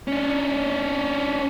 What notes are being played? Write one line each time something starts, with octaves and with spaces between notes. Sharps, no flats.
C#4 D4